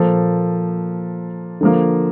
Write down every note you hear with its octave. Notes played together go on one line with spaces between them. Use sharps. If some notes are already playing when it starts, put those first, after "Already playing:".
Already playing: A#2 F3 A#3 A4
D3 F3 A#3